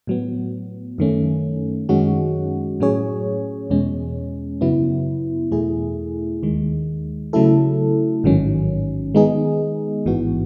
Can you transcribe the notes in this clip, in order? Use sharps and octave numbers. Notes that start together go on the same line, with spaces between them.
A2 F#3 B3
F#2 D#3 A3 C#4
F#2 D#3 G#3 C#4 F#4
A2 F#3 C#4 G#4 C#5
E2 B2 G#3 C#4
F#2 C#3 F#3 B3 E4
E2 B2 A3 E4 G#4
D#2 D#3 G#3
C#3 F#3 A3 E4 A4
A1 G#2 D#3 F#3 C#4
D#3 G#3 B3 D#4 G#4
A1 G#2 E3 B3 F#4